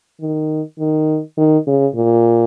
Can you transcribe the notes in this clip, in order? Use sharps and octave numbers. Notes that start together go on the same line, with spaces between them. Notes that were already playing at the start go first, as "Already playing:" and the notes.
D#3
D#3
D#3
C#3
A#2